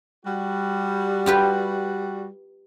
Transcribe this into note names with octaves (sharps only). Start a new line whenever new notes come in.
G3 F#4
F4 G4 B4